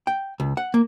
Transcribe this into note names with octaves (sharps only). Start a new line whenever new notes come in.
G5
C#2
F#5
A#3